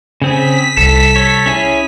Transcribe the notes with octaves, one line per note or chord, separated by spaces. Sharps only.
C#3 C4 G#4 B6
C2 A4
A4 C#5
C#4 E4 G#4